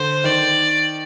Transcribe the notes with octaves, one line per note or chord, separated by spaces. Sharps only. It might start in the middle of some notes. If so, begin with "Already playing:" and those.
Already playing: D3 C5
D#3 D5